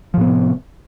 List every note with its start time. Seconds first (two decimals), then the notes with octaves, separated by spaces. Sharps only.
0.14 F3
0.17 A2
0.21 B3
0.24 C3